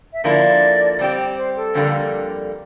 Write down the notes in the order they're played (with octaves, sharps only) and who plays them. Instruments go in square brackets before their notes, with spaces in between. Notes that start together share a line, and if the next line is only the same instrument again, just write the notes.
[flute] E5
[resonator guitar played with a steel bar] D3 F3 A#3 E4 A4 [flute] D5
[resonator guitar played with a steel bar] G3 C4 G4
[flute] C5
A4
[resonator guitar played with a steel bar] F2 D3 G3 A#3